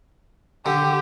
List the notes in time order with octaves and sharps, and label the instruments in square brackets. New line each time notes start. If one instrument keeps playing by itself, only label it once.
[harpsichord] D3 [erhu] G4